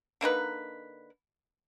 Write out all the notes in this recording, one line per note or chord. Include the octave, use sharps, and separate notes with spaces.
D3 A#3 D#4 B4